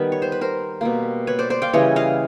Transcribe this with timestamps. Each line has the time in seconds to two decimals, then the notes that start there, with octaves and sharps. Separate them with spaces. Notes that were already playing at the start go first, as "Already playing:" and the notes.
Already playing: D#3 G3 B3 B4
0.12 C#5
0.22 C5
0.32 B4
0.41 A#4 C5
0.81 B2 G3 A#3
1.27 B4 C#5
1.39 C5 D5
1.50 C5 D5
1.62 F5 G5
1.73 C#3 E3 G3 C#5 D#5
1.96 D#5 F5